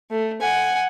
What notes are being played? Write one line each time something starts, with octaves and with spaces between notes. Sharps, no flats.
A3
F#5 G#5